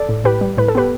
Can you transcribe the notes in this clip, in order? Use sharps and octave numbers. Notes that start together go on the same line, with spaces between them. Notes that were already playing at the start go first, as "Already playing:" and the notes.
Already playing: A4 D5
A2
A2 G4 B4
G3
A2 B4
A4
B3 G4 B4